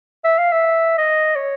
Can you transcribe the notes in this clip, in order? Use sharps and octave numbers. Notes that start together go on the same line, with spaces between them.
E5
F5
E5
D#5
C#5